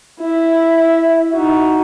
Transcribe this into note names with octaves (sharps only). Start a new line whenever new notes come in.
E4 E5
D#4 F#4